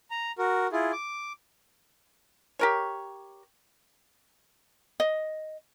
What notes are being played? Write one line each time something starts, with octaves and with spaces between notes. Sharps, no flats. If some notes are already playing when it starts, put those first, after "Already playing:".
A#5
F#4 A#4
E4 F4 G#4
D6
G4 A#4 C#5
D#5